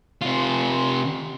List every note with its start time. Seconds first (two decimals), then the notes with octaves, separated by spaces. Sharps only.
0.22 C3 F4